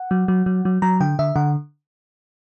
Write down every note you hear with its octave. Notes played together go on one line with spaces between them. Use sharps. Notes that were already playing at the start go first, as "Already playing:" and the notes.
Already playing: F#5
F#3
F#3
F#3
F#3
F#3 A#5
D3 G5
D3 E5
D3 F#5